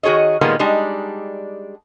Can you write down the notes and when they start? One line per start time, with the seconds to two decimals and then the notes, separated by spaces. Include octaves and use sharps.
0.03 D#3 F#4 G#4 C#5 D#5
0.41 A#2 D#3 G3 G#3 A#3 B3
0.59 G3 G#3 D4 D#4